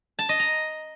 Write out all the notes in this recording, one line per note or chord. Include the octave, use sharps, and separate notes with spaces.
A5
D#5
A#5